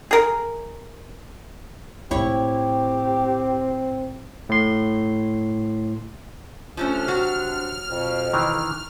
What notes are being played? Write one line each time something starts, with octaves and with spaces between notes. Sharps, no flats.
G#4 A#4
A2 F3 C4 E4 G4 C#5
A2 C6
C3 F3 A3 C#4 D4 F6
F#3 F#4
F2 B2
D#3 E3